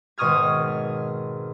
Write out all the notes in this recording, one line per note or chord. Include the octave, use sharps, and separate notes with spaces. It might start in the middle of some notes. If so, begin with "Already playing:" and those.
G#1 B2 C#6 D#6 F6 G#6